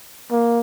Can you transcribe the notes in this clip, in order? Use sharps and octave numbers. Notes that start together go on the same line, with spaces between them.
A#3